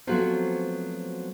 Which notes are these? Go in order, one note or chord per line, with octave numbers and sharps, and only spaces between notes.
F3 F#3 A3 B3 C4 F#4